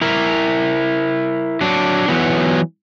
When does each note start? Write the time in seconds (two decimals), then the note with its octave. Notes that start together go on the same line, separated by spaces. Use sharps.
0.01 E4 A#4
1.61 F#3 D4
2.08 E3 F#3 B3